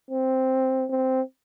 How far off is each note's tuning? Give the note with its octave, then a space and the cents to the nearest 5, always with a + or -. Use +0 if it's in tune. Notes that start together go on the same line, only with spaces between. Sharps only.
C4 +0
C4 -5